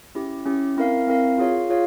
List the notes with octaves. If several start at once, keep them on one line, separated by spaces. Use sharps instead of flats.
C#4 E4 G4
C#4 E4 G4
C4 E4 A#4 F5
C4 E4 A#4 F5
F4 G#4 C#5 F5
F4 G#4 C#5 F5